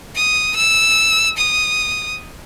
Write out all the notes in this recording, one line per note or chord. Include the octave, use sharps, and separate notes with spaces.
D#6
E6
D#6